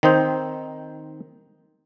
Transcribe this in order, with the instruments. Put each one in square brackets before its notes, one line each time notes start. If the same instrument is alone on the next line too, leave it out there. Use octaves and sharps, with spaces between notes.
[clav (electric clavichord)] D#3 C4 D#4 C5